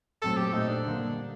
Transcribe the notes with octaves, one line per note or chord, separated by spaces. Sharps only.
A#2 F#3 A3 C4 A4
G4
A#2 A3 C4 D#4
D4
D3 G3 A#3